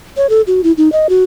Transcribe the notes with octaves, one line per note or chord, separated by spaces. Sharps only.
C#5
A4
F#4
E4
D#4
D#5
F#4